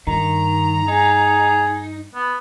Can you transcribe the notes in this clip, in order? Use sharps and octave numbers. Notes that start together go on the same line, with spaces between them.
G2 D#3 A#5
D#4 G#4
B3